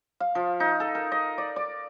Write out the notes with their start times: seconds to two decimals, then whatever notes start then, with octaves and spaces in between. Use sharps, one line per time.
0.20 F5
0.35 F3
0.60 D#4
0.80 A4
0.95 A#4
1.12 D#5
1.38 D5
1.56 D5